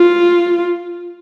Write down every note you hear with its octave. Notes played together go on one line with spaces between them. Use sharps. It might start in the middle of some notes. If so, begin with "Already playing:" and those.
Already playing: F4